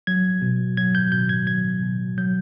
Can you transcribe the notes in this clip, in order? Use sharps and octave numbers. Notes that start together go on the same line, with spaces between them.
F#3 G#6
B2
F#3 G#6
G6
B2 G6
G#6
F#3 G#6
B2
F#3 G6